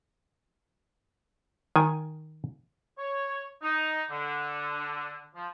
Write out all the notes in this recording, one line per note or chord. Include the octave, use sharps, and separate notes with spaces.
D#3 G#5
C#5
D#4
D3
F3